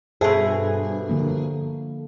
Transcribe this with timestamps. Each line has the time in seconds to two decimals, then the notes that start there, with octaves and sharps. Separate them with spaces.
0.21 G2 B2 G#4 A4 C5 E5
1.10 D3 F3 A#3